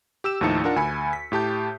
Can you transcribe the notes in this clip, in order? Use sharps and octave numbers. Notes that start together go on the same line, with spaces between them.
G4 E6 E7
D#2 A2 F3 D#4 A5 C#7
D4 D#4 F4 A#4 F#5 A5
D2 G#5 B5 C#7
B6
A2 G4 A5 G6